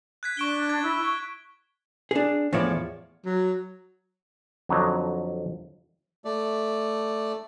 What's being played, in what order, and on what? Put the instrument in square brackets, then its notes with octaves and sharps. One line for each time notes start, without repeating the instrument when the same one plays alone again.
[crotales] F#6 G#6 B6
[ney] D4 [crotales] C#6 D7 G7
[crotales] G#6
[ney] E4
C#6
[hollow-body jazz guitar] D4 G#4
E2 A2 F3 F4 C#5 D5
[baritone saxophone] F#3
[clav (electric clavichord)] F2 D3 F#3 D#4
[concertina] A3 D5